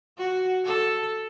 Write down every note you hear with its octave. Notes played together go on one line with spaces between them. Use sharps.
F#4
A4